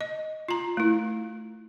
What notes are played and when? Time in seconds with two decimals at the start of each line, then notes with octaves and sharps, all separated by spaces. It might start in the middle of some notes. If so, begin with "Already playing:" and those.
0.01 D#5
0.49 F4 A#5
0.77 A3 E4